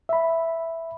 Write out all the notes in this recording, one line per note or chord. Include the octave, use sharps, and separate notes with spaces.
E5 B5